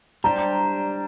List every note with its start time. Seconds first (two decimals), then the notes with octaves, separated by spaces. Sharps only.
0.24 G3 D4 G4 C5 A#5